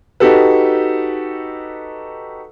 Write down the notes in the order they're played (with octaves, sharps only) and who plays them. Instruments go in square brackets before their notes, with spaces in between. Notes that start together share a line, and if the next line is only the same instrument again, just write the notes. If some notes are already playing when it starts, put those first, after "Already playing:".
[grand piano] D#4 F#4 G4 A4 B4